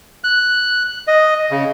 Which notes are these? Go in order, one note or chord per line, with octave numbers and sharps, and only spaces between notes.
F#6
D#5
C#3